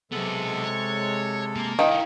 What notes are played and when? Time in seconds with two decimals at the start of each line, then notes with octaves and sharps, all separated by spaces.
0.12 C3 F#3 G#3 B3 A4
0.65 C#5
1.56 A#3
1.79 D#3 D#4 E4 D#5 F5